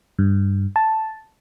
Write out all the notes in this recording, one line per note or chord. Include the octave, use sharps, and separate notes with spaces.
G2
A5